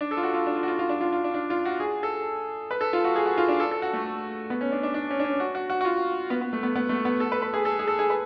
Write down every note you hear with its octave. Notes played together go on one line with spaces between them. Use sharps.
D4
A4
F4
F#4
F4
D4
F4
F#4
F4
F4
D4
F4
F4
D4
D4
F4
F#4
G#4
A4
B4
A4
F4
F#4
G#4
F#4
F4
D4
A4
A4
F#4
A3
B3
C#4
D4
D4
D4
C#4
D4
C#4
F#4
F#4
F#4
F#4
F4
B3
B3
A3
B3
B3
A3
B3
A4
B4
B4
G#4
A4
G#4
A4
G#4
B4